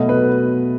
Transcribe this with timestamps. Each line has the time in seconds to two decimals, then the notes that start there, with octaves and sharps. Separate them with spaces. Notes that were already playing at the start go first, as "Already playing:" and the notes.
Already playing: B2 F#3 A3 D#5
0.09 B4